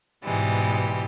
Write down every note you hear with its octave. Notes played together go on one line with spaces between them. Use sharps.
G#2 B2 E3 G3 G#3